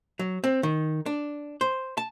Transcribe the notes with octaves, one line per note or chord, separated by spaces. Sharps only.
F#3
C4
D#3
D4
C5
A5